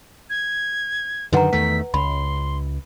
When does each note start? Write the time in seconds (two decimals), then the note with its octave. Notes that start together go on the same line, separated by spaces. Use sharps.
0.30 G#6
1.33 F#2 D3 D#3 B4 F#5 A#5
1.53 E2 D#3 A3 B6
1.94 C#2 B5 C6